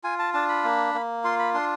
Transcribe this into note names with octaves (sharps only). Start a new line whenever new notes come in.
F4 G#5
A5
D4 A5
B5
A#3
A#3
F4 C6
B5
D4 C6